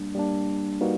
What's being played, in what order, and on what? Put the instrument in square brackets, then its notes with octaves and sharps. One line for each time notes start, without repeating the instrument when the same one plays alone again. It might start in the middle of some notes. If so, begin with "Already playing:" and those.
Already playing: [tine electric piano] G3 A#3 D4
G3 A#3 D4
G3 A#3 D#4 F#4 B4